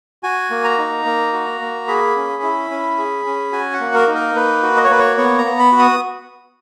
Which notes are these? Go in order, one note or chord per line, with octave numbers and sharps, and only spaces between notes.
F#4 G#5
A#3
A#5
D#4
A#3
F#4
A#3
G#4 B5
C#4
E4
C#4
G#4
C#4
F#4 G#5
F#5
A#3
A#4
D#4
A#4
A#3 B4
F#4
D#5
C#5
A#3 B4
C#5
B3 C#5
A#5
B3
B5
F#4
D#6